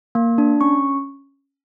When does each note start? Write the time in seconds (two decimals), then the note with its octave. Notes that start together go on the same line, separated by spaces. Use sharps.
0.15 A#3
0.38 D4
0.61 C#4 C#6